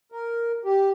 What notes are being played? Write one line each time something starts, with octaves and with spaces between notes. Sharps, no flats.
A#4
G4